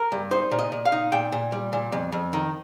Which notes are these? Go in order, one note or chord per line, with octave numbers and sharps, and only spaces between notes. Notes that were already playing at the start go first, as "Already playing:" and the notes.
Already playing: A#4
G2
D#4 C5
A#2
D#5
A#2
F5
D#4
A#2 G5
A#2
G3
A#2
F2
F2
D#3